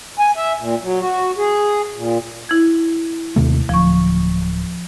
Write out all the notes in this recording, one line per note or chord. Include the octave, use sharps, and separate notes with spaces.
G#5
E5
A#2
F#3
F#4
G#4
A#2
E4 G#6
D#2 C3 A3
D1 F3 C#6